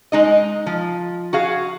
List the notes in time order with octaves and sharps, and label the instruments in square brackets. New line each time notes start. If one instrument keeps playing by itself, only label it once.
[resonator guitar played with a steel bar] G#3 D#4 D#5
F3
F#4 G#4 F5